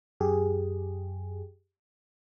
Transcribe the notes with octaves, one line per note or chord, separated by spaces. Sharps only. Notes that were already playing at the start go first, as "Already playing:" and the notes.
F#2 G4 G#4